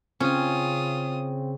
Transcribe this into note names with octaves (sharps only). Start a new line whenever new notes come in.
C#3 C4 C#4 F4 G#5 D#6